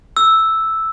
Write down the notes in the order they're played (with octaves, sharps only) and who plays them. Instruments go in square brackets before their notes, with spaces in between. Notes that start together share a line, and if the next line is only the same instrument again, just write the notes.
[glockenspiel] E6